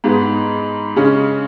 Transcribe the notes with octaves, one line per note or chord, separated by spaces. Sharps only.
G#2 G#3 B3
C#3 G#3 C#4